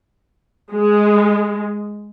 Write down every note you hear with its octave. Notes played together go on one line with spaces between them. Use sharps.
G#3